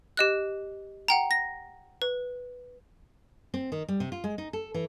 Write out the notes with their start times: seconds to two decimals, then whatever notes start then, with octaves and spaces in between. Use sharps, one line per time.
0.17 G4 D#5 F#6
1.08 F#5 G5 A#5
1.31 A#6
2.02 B4
3.54 C4
3.72 D#3
3.88 G3
4.00 C3
4.12 F4
4.24 G#3
4.38 D#4
4.53 A4
4.74 E3